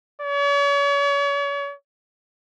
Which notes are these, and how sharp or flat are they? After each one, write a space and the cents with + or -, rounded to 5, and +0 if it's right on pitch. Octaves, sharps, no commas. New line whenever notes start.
C#5 +40